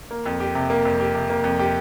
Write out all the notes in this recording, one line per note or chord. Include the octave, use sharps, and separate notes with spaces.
A#3
F2
G4
C3
A#3
F2
G4
C3
A#3
F2
G4